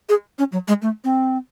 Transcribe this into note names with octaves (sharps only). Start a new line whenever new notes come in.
G#4
C#4
F#3
G#3
A3
C4